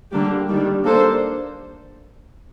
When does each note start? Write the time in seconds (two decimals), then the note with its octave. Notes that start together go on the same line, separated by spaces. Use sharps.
0.11 D3 G3 A#3 D4 G4
0.48 D#3 G3 D4
0.84 A#3 D4 A4 C5